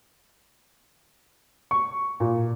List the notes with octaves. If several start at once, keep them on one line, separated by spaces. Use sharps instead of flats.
C#6
A#2